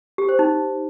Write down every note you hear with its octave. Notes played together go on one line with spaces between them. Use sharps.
G4
C5
D#4